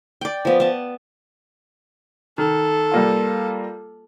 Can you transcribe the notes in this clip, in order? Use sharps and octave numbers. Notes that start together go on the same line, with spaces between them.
D5 G5
F3 B3
B3 A5
D#3 A4
G3 A#3 F4